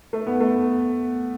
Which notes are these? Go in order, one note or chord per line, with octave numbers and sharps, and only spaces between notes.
A3
B3
A3